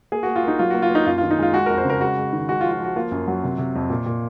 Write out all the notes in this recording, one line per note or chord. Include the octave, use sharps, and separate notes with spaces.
A#3 G#4
A#3 F#4
F4
A#3 D#4
F#3 F4
A#3 F#4
F4
A#3 D#4
F#2 F4
D#3 F4
D#4
G#3 F4
G#3 F#4
F2 A#4
C5
C#3 A#4
G#3 F#4
G#3
D#3
G#3 F#4
F4
F3
F4
F3 F#4
A#3 F4
F#2
F#3
C3
C3
F2
A#2
A#2